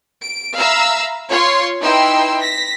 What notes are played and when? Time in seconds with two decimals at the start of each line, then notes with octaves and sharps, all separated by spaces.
0.22 D7
0.57 E5 F5 A#5 B5 E6
1.28 F4 C#5 C6
1.81 D#4 E4 B4 G5 C6 E6
2.40 A#6 B6